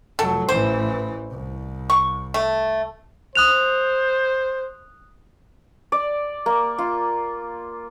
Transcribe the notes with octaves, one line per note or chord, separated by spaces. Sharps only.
F1 F#3 A4
A1 E3 C5
C2
C#6
A3
C5 D#6 F#6 F7
D5
A#3
F4